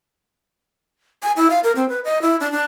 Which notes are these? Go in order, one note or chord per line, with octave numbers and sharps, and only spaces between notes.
G#5
E4
F5
A#4
C4
B4
D#5
E4
D4
D4